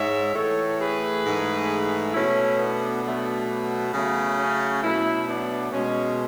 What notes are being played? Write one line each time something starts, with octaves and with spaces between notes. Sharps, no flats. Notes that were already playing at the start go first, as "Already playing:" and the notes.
Already playing: G#2 G#3 C#5 E5
A2 E3 A3 A4 C#5
G#4 B4
G#2 E3 A3
B2 A3 C#4 E4
B3 D4
B2 F#3 A3
B3
C#3 F#3 A3
C#4
B2 F#3 A3 C#4 E4
B3 D4
B2 G#3 C#4